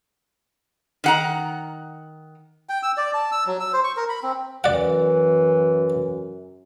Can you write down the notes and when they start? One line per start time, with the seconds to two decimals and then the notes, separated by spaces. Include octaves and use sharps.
1.04 D#3 F#5 A#5
2.69 G5
2.83 E6
2.97 D5
3.14 A5
3.32 E6
3.46 F#3
3.60 E6
3.73 C5
3.84 C#6
3.97 A#4
4.09 B5
4.23 C4
4.64 F#2 E3 D5 F#5